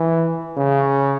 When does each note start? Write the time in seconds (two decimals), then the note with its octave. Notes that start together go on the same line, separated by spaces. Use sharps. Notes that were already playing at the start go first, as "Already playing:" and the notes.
Already playing: E3
0.57 C#3